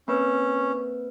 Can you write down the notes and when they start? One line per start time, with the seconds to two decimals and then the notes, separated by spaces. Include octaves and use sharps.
0.08 A#3 C4 C#4 B4